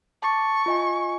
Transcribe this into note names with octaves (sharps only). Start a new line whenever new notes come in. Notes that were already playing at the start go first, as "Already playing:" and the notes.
A5 C#6 D6 A6
F4 D#5 G#5